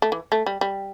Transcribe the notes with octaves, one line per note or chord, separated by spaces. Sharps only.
A3
E3
A3
G3
G3